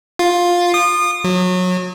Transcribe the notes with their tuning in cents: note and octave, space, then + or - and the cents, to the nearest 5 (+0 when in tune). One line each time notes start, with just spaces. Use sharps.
F4 +10
D#6 -30
F#3 -25